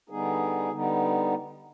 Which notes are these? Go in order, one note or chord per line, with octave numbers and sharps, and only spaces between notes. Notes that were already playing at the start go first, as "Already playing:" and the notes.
D3 G3 B3 D#4 G#4
D3 G3 B3 D#4